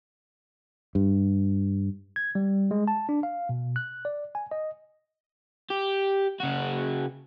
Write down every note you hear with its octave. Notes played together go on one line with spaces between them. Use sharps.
G2
G#6
G3
G#3
A5
D4
F5
B2
F#6
D5
G#5
D#5
G4
C#3 F#4